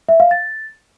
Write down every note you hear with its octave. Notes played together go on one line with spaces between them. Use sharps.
E5
F5
A6